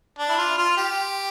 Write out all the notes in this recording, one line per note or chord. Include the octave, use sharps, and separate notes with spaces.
D4
E4
F4
F4
G4